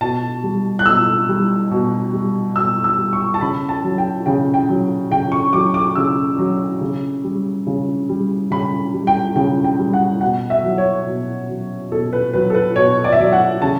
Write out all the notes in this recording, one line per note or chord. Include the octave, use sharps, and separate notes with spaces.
B2 A5
G3
F#6
B2 E6
G3
B2
G3
B2 E6
E6
G3
C#6
A5
C#3 B5
A5
F#3
G5
C#3 G5
G5
F#3
C#3 G5
C#6
F#3 D6
D6
C#3 E6
F#3
C#3
G3
C#3
G3
C#3 B5
G3
G5
C#3 G5
G5
G3
F#5
B2 F#5
E5
F#3
C#5
B2
F#3
B2 A4
B4
F#3 B4
A4
B4
B2 C#5
D5
E5
F#3 D5
F#5
C#3 A5